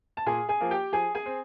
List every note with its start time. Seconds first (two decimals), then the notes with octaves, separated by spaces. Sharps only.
0.17 A5
0.26 A#2 G#4 G#5
0.49 G#4 G#5
0.61 F3 A#3
0.71 G4 G5
0.92 F3 G#4 G#5
1.15 G#4 G#5
1.26 C4